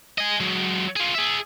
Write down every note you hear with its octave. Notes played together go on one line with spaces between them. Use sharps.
D#5 G#5
F#3 G#3
F4 G#4
G#4 E5